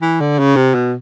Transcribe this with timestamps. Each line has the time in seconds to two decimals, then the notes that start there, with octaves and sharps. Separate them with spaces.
0.02 E3
0.20 D3
0.39 C#3
0.56 C3
0.74 B2